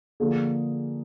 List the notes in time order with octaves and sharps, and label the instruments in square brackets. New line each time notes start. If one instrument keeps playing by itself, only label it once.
[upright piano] D3 F3 A#3 D4 G#4